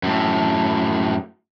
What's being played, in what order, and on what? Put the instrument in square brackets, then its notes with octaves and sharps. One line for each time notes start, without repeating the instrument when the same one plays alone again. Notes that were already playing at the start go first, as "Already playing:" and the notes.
[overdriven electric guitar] F#2 A2